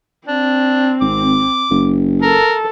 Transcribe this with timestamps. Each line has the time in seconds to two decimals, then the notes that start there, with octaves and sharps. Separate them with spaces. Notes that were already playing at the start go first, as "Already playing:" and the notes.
0.27 C4 D4
1.01 G#1 D6
1.70 F#1
2.22 A4 A#4